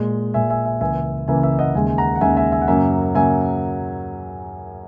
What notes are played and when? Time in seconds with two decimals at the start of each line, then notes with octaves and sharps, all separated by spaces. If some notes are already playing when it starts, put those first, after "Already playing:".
Already playing: A#2 G#3
0.34 A#2 G#3 E5 G#5
0.50 E5 G#5
0.66 E5 G#5
0.81 C#2 C#3 E3 A#3 E5 G#5
1.28 C#2 C#3 E3 A#3 E5 G#5
1.43 E5 G#5
1.59 D#5 F#5
1.75 D#2 C#3 G#3 E5 G#5
1.87 G#5
1.98 F#5 A#5
2.16 F#5
2.21 D#2 C#3 G#3 E5 G#5
2.37 E5 G#5
2.52 E5 G#5
2.61 F#5
2.68 F#2 C#3 F#3 A#3 E5 G#5
3.15 C#3 F#3 A#3 E5 G#5